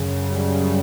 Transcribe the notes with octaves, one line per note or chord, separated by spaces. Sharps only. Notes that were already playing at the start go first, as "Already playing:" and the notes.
Already playing: F#2 C#3
G3